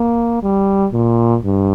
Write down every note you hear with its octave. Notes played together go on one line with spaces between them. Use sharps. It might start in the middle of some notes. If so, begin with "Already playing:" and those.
Already playing: A#3
G3
A#2
G2